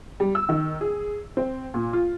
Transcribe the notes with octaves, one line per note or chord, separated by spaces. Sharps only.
G3
E6
D#3
G#4
C4
A#2
F4